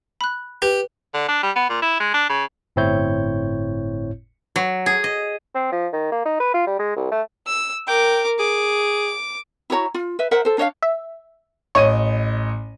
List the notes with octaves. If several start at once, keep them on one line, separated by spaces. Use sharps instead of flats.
B5 F#6
G4 B4
D3
D4
G3
B3
A#2
E4
G#3
D4
C#3
G1 A2 C4 E4 C#5 G6
F#3
G#4
D#5
C4
F3
D#3
A#3
D#4
B4
F4
G3
G#3
C2
A3
E6
A#4 G5 D6
G#4 D6
E4 F#4 C#5 A#5
F4
B4 E5
A#4 C5 E5 F#5
A4 C5
D4 C#5 D#5 F5
E5
A1 C#5 D#5 D#7